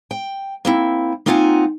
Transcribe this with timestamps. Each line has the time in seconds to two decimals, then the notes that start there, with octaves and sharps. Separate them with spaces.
0.11 G5
0.65 A#3 C4 E4
1.26 A#3 C4 D#4 F4 F#5 G#5